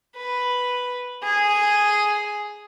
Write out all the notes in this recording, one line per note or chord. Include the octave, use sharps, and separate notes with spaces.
B4
G#4